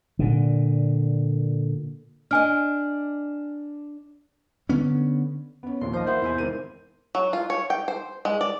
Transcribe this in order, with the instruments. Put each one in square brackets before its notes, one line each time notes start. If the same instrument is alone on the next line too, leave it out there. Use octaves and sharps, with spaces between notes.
[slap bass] A#2 D3
[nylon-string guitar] D4 D#5 [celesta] G#5 F6
[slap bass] D3 B3 C#4
[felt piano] B3 C#4
[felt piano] A#1 D#2 [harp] C6
[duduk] F3 [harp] C5 D#5
[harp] E3 [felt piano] A#4 E5 F#5 [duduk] C5
[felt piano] E2 [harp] C3 E4 G#5
[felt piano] G#1 A#4 D#7
[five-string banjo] F#3
F4
C#5
G5
C5
G#3
D5